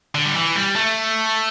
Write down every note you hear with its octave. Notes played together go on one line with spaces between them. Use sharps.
D3
G3
E3
G3
A3